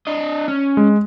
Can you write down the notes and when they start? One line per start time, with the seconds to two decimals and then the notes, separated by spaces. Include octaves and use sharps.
0.07 D4 D#5
0.48 C#4
0.77 G#3